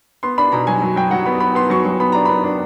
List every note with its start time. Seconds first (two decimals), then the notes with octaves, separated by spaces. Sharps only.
0.23 B3 C6
0.38 D4 B5
0.52 B2 A#5
0.67 F#3 G#5
0.82 F#3
0.96 F#3 G5
1.11 F#3 F#5
1.26 B3 B5
1.40 B3 B5
1.55 B3 C6
1.70 F#3 C#6
1.85 F#3
2.00 B3 B5
2.12 D4 A#5
2.25 B3 B5
2.44 D4